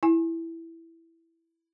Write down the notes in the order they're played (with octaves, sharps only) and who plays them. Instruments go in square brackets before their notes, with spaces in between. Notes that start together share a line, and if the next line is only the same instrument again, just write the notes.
[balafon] E4 G#5